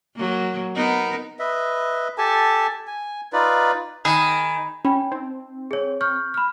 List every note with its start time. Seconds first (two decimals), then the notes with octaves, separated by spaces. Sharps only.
0.15 F#3 A#3
0.75 B3 D#4 A#4
1.39 B4 D#5 E5
2.18 G4 A4 G#5 A5
2.87 G#5
3.33 D#4 F4 B4 D5
4.05 D#3 G#4 B5
4.85 C#4 G5 B5
5.12 C4 D#4
5.71 G#4 C#5
6.01 C#6 F6 G6
6.34 B5 F6